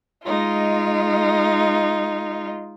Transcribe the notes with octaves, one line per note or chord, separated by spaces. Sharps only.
G#3 D#4 F4